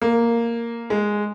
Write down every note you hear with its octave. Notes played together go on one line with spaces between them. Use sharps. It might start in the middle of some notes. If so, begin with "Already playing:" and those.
A#3
G#3